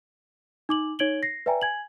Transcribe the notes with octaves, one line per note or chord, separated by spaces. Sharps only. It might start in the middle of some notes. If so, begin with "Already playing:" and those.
D#4 D6 F#7
D#4 C#5 G#6 D7 F#7 G7
A#6 C7
B4 D5 E5 G5 G#5 A#5
G#5 G#6 F#7